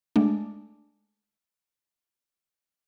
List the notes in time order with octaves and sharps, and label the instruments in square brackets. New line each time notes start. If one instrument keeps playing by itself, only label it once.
[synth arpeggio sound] G#3 A3 D4